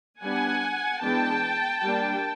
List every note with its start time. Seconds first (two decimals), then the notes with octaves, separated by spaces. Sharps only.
0.22 G3 B3 D4 F#5 G#5
1.03 E3 G#3 B3 D4 G5 A5
1.83 G3 A#3 D4